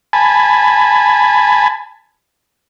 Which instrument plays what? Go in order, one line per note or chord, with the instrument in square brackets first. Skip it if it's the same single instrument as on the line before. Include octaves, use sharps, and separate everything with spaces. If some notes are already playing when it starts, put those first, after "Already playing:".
[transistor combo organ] G#5 A5 B5